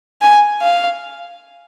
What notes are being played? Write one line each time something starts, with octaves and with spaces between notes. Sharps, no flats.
G#5
F5